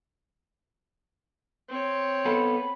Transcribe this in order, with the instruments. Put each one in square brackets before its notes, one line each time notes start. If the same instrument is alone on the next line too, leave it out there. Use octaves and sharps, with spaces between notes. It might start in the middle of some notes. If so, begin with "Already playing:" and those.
[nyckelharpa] C4 C#5
[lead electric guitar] B3 A4 [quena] B5